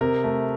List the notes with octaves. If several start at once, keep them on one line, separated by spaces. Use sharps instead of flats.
C3 A#4
A3